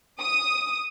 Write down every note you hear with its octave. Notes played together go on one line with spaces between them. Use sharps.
D#6